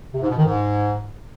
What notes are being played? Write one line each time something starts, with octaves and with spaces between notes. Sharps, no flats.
C3
G#2
B2
D#3
G#2